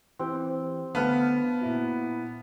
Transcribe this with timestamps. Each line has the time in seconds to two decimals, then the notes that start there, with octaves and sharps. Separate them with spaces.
0.19 E3 C4 G4
0.95 D3 A3 B3 B4 F5 A5
1.61 A#2 E4 F#4